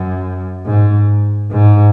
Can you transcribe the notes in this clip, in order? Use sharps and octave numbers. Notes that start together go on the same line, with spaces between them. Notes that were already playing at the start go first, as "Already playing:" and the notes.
Already playing: F#2
G#2
G#2